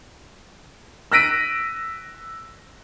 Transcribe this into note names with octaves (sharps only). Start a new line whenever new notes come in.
E6 F#6 A#6 B6 D7 D#7